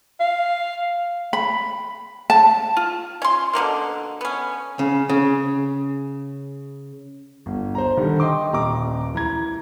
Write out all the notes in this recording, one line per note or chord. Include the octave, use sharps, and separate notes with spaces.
F5
B5
A5
F4
C#4 C6
B2 D3 D#3 A#3
B3 C#4
C#3
C#3
G1
C5 A#5
D3 D#3 G3
D#5 G5 C6 D6
D#1 A#5 D6
E3 A#5 G#6